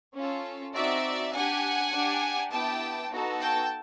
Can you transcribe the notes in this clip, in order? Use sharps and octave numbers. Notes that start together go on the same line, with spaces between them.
C#4 F4 A4
C4 D#4 F#4 D5 E5
D4 G4 F#5 G#5
D4 G4
B3 E4 G4 G5 A5
B3 D#4 F#4 A4
G5 A5